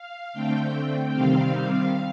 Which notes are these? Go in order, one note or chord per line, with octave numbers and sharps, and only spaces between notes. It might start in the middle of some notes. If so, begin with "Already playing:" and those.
Already playing: F5
D3 A3 C4 G5
C3 D#3 G3 C4 F5